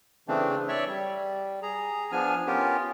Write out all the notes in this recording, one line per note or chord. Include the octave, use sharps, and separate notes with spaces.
C#3 E3 A3 C4 D4
C#5 D5 E5 C#6
G3
G#4 A#5
F3 B3 D4 G#5 F6
B3 C#4 F4 G4 A#4